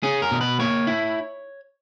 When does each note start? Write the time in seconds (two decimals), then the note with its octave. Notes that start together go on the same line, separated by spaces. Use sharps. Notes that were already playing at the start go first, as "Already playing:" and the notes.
0.03 C#4 G#4
0.22 A#4
0.31 B2
0.41 B4
0.59 A#3 C#5
0.87 E4